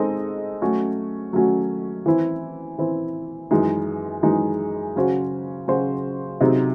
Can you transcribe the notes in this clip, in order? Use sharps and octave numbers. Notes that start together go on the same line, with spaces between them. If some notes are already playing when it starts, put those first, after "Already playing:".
Already playing: G#3 C4 D#4 A4 D#5
F#3 A3 C#4 F#4
F#3 A3 C#4 F#4
E3 C4 E4
E3 C4 E4
F#2 E3 G#3 D#4
F#2 E3 G#3 D#4
C#3 F#3 C#4 F#4 C5
C#3 F#3 C#4 F#4 C5
C3 F#3 C4 D#4 G#4